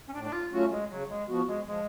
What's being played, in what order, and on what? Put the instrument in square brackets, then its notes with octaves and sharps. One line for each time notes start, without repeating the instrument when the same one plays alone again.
[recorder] C#4
[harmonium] A2 [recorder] D4
[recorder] D4
F4
[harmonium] F#3 A3 C#4 F4 [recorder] F#4
[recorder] G#3
[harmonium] C#3 [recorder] F#3
[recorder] G#3
[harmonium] F3 B3 F#4
[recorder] G#3
[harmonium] F3 [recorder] G#3